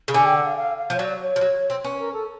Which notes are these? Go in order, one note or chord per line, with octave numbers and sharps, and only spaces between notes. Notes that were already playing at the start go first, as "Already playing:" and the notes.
C#3
D3 G#5
G5
F#5
F5
F5
F5
F3
C#5
F#3 D5
C#5
F3
F#3
C4
C#4 B4
A#4
A4